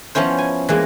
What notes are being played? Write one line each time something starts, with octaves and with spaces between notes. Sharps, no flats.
F3 B3 C#4 E4 C5
G#5
E3 G#3 A#3